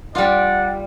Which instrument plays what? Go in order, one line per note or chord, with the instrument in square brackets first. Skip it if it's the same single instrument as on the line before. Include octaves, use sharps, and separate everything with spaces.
[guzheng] G3 F4 [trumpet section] D5 F#5